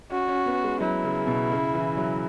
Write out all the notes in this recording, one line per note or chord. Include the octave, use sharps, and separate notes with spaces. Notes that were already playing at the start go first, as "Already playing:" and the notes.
C#4 F#4
C#4
B3
G#3
F#3 E4
C#3
B2
C#3
E3
F#3